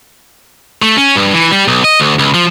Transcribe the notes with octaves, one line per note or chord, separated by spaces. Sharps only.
A3
C#4
G2
E3
G3
B1
D#5
D2
C#2
F3